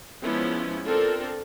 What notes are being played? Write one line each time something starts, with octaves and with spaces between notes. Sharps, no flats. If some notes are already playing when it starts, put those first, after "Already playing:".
F3 G#3 B3 C#4 E4
C4 D4 F4 A4 A#4